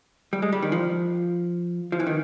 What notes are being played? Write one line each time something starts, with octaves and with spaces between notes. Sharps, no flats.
G3
G#3
G3
D#3
F3
F3
E3
D#3